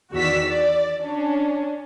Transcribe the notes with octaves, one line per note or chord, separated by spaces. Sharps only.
E2 D#3 F#4 D5 E6 B6
D5
C#4 D4